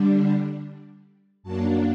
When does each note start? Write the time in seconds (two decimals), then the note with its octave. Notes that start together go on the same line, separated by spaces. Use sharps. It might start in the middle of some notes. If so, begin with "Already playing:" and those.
Already playing: D3 G3 D4
1.43 F#2 F#3 A#3 D4 A5